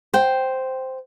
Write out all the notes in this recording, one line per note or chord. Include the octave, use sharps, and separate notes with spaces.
C5 G5